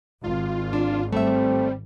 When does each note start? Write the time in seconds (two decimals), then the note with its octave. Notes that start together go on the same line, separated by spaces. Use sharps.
0.24 G#1 F4
0.73 D4
1.13 G3 A3 C4 E5